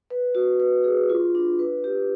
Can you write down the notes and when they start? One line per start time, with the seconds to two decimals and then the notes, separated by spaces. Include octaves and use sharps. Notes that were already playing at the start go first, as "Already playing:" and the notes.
0.10 B4
0.35 F#4
0.60 B4
0.84 G#4
1.10 F4
1.35 D4
1.59 B4
1.84 G4